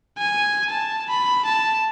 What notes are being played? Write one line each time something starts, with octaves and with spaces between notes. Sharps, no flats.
G#5
A5
B5
A5